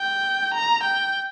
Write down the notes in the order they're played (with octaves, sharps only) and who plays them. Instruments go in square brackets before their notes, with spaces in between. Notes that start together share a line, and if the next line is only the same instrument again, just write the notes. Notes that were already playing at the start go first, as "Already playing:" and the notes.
Already playing: [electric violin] G5
A#5
G5